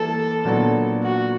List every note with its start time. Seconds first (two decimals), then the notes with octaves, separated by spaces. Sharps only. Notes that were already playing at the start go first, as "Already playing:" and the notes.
Already playing: E3 G3 A#3 A4
0.45 A#2 F#3 B3 D4
1.03 F#4